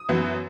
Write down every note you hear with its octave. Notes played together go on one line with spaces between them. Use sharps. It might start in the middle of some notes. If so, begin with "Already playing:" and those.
Already playing: D#6
F#2 E3 B3